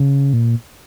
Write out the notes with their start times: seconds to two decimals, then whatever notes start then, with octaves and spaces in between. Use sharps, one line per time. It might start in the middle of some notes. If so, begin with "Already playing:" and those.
Already playing: C#3
0.33 A#2